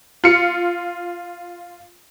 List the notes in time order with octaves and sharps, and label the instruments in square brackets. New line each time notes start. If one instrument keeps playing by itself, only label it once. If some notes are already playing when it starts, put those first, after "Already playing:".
[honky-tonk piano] F4 C#7